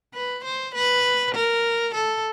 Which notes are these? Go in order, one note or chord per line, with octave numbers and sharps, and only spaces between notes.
B4
C5
B4
A#4
A4